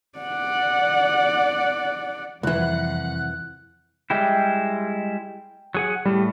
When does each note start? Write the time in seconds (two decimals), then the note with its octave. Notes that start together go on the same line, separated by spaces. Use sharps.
0.19 D5 F#5
2.43 C2 F2 E3 F#5 F#6
4.10 G3 G#3 E4 G5
5.74 F#3 G#4 F#5
6.06 A2 G3